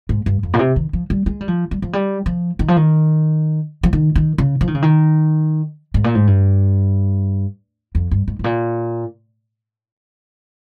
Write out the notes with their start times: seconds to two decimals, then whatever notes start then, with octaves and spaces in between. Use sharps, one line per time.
0.09 G#2
0.26 G2
0.43 F2
0.54 A#2
0.59 C3
0.76 D#3
0.93 F3
1.10 G3
1.26 G#3
1.41 G3
1.48 F3
1.71 G3
1.82 F3
1.93 G3
2.26 F3
2.59 D#3
2.68 F3
2.76 D#3
3.83 F3
3.93 D#3
4.16 D#3
4.38 C#3
4.61 F3
4.67 D#3
4.75 C#3
4.82 D#3
5.94 G#2
6.04 A#2
6.15 G#2
6.27 G2
7.95 F2
8.11 G2
8.28 G#2
8.39 G#2
8.44 A#2